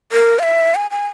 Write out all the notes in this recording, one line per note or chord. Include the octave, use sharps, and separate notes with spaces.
A#4
F5
E5
G#5
G#5